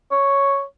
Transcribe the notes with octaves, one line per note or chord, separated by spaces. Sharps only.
C#5